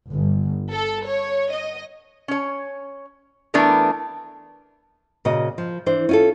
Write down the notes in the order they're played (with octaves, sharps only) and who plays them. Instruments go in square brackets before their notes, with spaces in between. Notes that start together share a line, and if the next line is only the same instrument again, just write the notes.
[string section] G1
A4
C#5
D#5
[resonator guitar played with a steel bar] C#4 C#5
E3 A3 B3 D4 E4 A#4
[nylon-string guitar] A#2 C#3 F#4 D#5
F3
E3 D4 C5
C#4 F4 A4